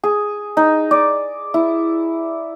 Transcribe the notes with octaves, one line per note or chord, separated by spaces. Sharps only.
G#4
D#4
D5
E4